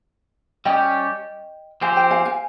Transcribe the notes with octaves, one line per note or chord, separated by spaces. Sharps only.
G3 C#4 G4 D#5 G5
F3 C4 G4 C5 F5 G#5
G5 A#5
F5 G#5
F5 G#5